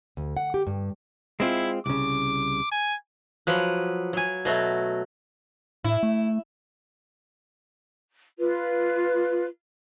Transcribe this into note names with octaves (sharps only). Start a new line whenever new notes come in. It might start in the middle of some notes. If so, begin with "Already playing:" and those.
D2
F#5
G4
G2
G#3 C4 E4 F4
C2 C#3 D6
G#5
F3 F#3 B4
F#3 G#5
B2 F#3 A3
A2 E4
A3
F4 B4